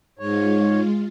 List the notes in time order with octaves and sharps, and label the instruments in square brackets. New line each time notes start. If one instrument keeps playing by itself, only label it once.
[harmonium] G#2 C#5 [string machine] G#3 F4